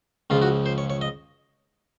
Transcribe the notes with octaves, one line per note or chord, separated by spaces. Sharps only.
C#2 C#3 F3 F4
F#4
C5
C#5
C#5
D#5